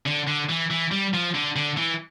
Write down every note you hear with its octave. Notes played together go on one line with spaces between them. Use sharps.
D3
D3
E3
E3
G3
F3
D3
D3
E3